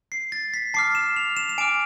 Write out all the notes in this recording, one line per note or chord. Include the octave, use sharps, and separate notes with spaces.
C7
A6
B6
A5 D6 F6 C7
E7
F7
E7
E7
G#5 D6 F6 D7